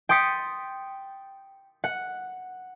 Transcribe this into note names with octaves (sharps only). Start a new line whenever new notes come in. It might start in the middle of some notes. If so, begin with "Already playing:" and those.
G5 C6 D#6 A6 B6 C#7
F#5